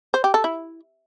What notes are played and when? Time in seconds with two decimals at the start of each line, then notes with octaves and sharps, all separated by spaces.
0.14 C5
0.24 G4
0.34 A4
0.44 E4